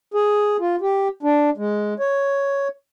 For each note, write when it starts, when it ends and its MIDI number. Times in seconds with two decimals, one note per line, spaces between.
0.14 0.57 68
0.60 0.76 65
0.81 1.08 67
1.23 1.50 62
1.57 1.94 56
2.00 2.68 73